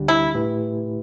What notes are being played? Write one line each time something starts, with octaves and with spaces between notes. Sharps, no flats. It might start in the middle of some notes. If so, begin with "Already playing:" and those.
Already playing: D2 D3 G3 D4 G4
E4
A2 A3 E4 G4 B4